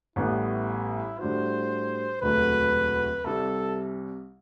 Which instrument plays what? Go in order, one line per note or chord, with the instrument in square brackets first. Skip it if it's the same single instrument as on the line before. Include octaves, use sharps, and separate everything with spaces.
[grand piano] A1 A2 G3 B3 [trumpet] E4
[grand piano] A2 G3 D4 F#4 [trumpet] C5
[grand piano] E1 D2 C3 F#3 A3 [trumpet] B4
[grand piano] C2 C3 G3 [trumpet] A4